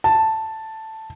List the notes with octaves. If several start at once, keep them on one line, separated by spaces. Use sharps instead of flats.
A5